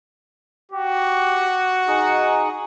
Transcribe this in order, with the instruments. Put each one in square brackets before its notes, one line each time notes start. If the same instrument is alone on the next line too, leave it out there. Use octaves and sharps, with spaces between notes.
[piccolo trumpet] F#4 [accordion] G4
[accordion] D#4 G#4 D#6